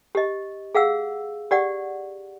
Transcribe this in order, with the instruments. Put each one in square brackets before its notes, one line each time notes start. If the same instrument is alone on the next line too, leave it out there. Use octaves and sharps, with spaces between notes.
[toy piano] G4 D#5
G#4 F5 F#5 E6
G4 D5 F#5